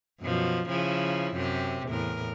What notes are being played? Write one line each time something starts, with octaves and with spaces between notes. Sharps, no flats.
F#2 B2 F3
C#3 F3 E4
F#2 C3 G4
E2 A2 A#4